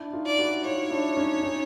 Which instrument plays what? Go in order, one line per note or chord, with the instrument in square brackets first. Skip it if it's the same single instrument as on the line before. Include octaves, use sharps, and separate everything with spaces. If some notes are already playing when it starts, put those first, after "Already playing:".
Already playing: [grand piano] D4 E4
D#4 F4
[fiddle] D5
[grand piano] E4 F#4
[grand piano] D#4 F4 [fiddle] C#5
[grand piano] D4 E4
C#4 D#4
C#4 D#4